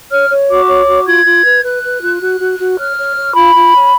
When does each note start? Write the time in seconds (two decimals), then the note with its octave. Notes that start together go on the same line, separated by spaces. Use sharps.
0.10 C#5 F6
0.30 C#5
0.48 F#4 D6
0.67 C#5
0.86 F#4
1.06 F4 G#6
1.24 F4
1.44 B4
1.63 B4 F#6
1.83 B4
2.01 F4
2.20 F#4
2.39 F#4
2.58 F#4
2.78 C#5 F6
2.97 C#5
3.15 C#5
3.34 F4 B5
3.54 F4
3.73 C#5